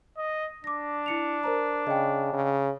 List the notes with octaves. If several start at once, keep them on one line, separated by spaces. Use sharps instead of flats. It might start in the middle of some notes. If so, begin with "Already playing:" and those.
D#5
D4 D6 A#6
E4 C#7 F7
A#4 C5 A#5
C#3 D#5 G5
C#3